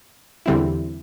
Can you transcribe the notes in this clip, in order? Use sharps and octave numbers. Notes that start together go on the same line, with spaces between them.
E2 D3 G3 C4 E4